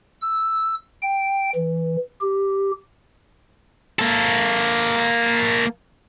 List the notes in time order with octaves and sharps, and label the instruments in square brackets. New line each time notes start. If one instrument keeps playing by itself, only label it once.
[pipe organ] E6
G5
E3
G4
[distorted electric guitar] A#3 A4